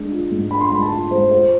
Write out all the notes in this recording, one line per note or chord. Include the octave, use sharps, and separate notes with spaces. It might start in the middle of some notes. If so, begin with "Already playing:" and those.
Already playing: G#3 D4
F4
G#2
D4 B5
C6
G#3 B5
A5
F4
G#2 C5
F4 C5